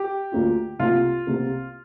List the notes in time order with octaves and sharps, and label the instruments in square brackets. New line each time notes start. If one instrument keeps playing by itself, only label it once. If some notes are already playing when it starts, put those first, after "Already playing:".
Already playing: [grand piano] G4
[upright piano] D2 D3 A#3 D4 F4
[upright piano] C2 C3 A#3 [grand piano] F4
[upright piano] C2 C3 A#3